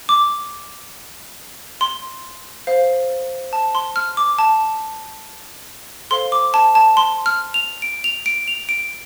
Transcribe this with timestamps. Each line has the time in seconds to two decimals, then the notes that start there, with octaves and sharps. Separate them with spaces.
0.09 D6
1.81 C6
2.67 C5 F5
3.53 A5
3.75 C6
3.96 F6
4.17 D6
4.39 A5
6.11 A4 C5 F5 C6
6.32 D6
6.54 A5
6.75 A5
6.97 C6
7.26 F6
7.54 F7
7.82 D7
8.04 F7
8.26 D7
8.48 F7
8.69 D7